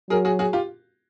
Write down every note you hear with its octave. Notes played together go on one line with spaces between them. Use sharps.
F#3 G#4 A#4
F#4 G#4
F#4 G#4
F4 G4